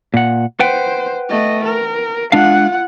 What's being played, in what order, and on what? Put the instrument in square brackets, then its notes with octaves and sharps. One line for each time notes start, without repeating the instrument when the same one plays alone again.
[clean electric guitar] A#2 F#5
[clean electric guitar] B4 F#5 G5 [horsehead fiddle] C5
[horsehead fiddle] A3 D#5
A#4
[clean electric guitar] G#3 D4 F5 [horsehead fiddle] F4 F#5